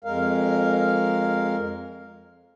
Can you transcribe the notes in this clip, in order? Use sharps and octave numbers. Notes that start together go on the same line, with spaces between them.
F2 G#3 A#4 F5